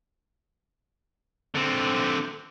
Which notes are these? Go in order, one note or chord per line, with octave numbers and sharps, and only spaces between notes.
D3 C4